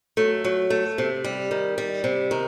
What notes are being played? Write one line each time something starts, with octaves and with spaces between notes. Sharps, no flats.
F#3 A3
F#3
A3
C3
G3
D#3
G3
C3
D#3